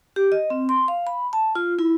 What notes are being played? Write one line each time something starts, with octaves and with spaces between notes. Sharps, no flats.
G4
D#5
C4
C6
F5
B5
A5
F4
E4